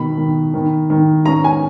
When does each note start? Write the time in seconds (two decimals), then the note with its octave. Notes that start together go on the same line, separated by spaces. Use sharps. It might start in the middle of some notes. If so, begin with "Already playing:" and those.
Already playing: B2 D#3 B5
0.18 D#3
0.54 D#3
0.90 D#3
1.26 C#4 A#5
1.44 G#5